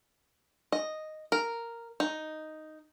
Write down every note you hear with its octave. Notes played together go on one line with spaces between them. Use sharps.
D#5
A#4
D#4